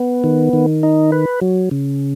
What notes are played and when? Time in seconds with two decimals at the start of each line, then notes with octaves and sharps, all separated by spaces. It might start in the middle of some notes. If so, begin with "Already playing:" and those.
Already playing: B3
0.24 D#3
0.53 D#3
0.83 D#4
1.12 B4
1.41 F#3
1.71 C#3